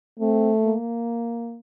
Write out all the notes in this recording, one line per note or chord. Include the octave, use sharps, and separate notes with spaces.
A3 C4
A#3